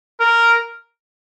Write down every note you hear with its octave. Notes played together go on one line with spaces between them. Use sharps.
A#4